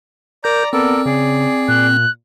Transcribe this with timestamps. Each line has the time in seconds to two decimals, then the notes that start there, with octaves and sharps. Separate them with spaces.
0.44 A#4 D5 A#5 G6
0.73 B3 C4 A4 A#4 D5
1.06 C#3 G#4 D5
1.68 A#2 F#6